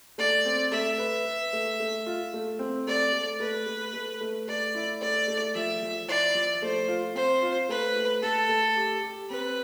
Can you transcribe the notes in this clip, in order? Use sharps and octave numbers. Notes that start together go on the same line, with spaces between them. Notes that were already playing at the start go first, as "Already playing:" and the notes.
A3 D5
C4
A3 E5
B4
B4
A3
A3
F4
A3
C4
A3 D5
A3
A3 B4
A3
A3
A3
A3 D5
E4
A3 D5
A3
F3 E5
F3
E4 D5
F3
A3 C5
F4
C4 C5
F4
A3 B4
A3
A3 A4
A3
G4
G4
C4 B4